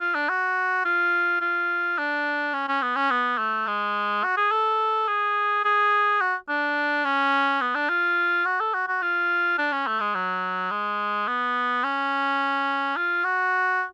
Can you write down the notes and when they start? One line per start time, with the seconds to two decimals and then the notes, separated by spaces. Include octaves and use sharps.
0.01 F4
0.15 D4
0.29 F#4
0.85 F4
1.41 F4
1.98 D4
2.54 C#4
2.68 C#4
2.82 B3
2.96 C#4
3.11 B3
3.38 A3
3.67 G#3
4.23 F#4
4.37 G#4
4.51 A4
5.08 G#4
5.65 G#4
6.21 F#4
6.49 D4
7.05 C#4
7.61 B3
7.75 D4
7.89 F4
8.45 F#4
8.60 A4
8.74 F#4
8.88 F#4
9.02 F4
9.58 D4
9.73 C#4
9.87 A3
10.00 G#3
10.14 F#3
10.71 G#3
11.28 B3
11.84 C#4
12.96 F4
13.24 F#4